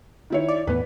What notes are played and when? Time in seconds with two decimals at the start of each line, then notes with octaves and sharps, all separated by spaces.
0.30 D#3 E4 C#5
0.48 D5
0.67 E2 A2 B3 B4